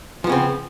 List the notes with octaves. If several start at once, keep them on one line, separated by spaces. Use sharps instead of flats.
C#3 F3 B3 C4